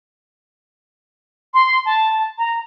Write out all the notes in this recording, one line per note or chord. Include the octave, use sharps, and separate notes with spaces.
C6
A5
A#5